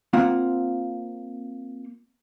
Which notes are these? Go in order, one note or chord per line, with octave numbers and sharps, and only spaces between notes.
A#3 C4 F4 F#5